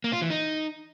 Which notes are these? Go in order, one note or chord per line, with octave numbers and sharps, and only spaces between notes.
A#3
F4
E3
D#4